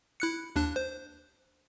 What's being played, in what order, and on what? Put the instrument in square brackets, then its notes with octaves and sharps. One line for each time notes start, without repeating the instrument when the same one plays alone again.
[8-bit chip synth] E4 F#6 C#7
D#2 D4 F#6
C5